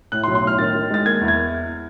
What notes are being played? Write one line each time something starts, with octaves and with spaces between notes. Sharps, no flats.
A2 F#6
C6
B1
C6
A2 F6
D#3 A6
D#3
G#3 A6
A#3 G#6
E2
G#6